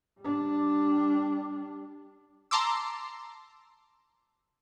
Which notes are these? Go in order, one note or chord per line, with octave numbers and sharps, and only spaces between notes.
G3 D4
A5 A#5 C6 D6 E6